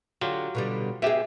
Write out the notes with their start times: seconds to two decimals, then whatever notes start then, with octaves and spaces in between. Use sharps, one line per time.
0.21 D3 F#3 F4 G4
0.55 B2 D3 G3
1.02 B2 G4 G#4 E5